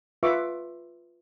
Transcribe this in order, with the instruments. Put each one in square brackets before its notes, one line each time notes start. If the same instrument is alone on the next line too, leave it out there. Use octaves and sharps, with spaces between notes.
[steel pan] F4 B4 E5 C#6 D6